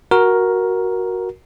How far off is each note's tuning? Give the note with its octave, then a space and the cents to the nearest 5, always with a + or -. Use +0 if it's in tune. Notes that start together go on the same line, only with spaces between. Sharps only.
F#4 +0 A#4 +10